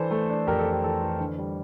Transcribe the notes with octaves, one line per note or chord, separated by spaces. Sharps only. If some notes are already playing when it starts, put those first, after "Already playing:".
Already playing: E3 D4 A4 C5
A3
D4
F2 G4 A#4
A4
D4
G4
E3 A4
E3
D3
G3